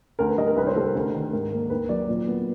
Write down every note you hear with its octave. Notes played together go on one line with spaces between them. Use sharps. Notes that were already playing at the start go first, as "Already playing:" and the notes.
D2 A#4
B4
G3 D#5
A#4
C2 B4
C5
G3 A4
A#4
D2
D#3
G#2 A#4
A#3
D#2 B4
F#3 D5
A#2
B3